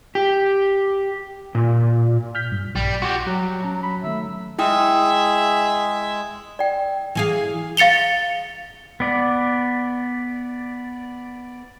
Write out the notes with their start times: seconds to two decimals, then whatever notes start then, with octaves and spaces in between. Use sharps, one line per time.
0.15 G4
1.55 A#2
2.35 F6 G6 B6
2.52 G2
2.76 A#1 G3
3.02 F#4 G4 C6 A6
3.27 F#3 G3 F#4 F#6
3.63 C#4 A5 A#5
3.83 B5
4.04 D#3 F#3 A3 E5
4.59 G#3 E4 G#4 E5 G5 D#6
6.59 D5 G5
7.15 E3 G#4 F5
7.77 F5 A6 C#7 F7 G7
9.00 B3 D5